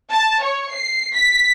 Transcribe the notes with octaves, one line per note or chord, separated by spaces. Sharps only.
A5
C#5
C7
B6